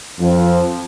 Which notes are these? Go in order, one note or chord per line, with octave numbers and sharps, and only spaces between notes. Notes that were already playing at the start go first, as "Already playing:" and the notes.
F2 F3